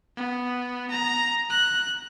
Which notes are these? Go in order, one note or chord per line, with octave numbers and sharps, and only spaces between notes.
B3
A#5
F#6